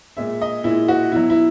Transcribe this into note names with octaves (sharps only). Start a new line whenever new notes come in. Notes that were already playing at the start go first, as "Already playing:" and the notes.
A#2 G#3 E5
D#5
A#2 G#3 E4
F#4
B2 F#3 E4
E4